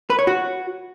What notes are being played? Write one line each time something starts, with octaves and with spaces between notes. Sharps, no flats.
B4
C#5
F#4